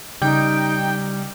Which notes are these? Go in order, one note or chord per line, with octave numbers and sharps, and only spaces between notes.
C#3 G3 D#4 G5